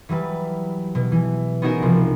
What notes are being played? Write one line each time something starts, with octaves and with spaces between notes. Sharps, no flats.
E3 F#3 G3 B4
B2
E3
B3 C#4 D#4 F#4 G#4 A#4
C2 F3 D4 F#4